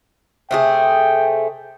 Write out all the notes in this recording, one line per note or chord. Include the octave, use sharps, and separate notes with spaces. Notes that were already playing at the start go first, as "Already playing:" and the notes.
C3 A3 G#4 G5